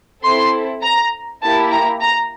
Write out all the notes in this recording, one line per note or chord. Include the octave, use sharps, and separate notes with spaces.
C4 E4 A4 C6
A#5
A#3 E4 G4 A5
A#5
A#5